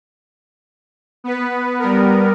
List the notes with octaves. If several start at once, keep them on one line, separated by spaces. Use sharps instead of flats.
B3 B4
G3 B3 A#4